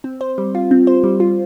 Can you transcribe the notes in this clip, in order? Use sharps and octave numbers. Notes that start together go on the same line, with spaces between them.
C4
C5
G3
F4
C4
C5
G3
F4